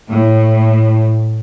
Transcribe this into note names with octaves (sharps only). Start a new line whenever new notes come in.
A2